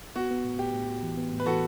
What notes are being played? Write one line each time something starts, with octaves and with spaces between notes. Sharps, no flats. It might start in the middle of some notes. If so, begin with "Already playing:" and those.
B3 F#4
B3
A2
A2 G4
A2
F#4
E3
B3
A2
B4
E3 F#4 A4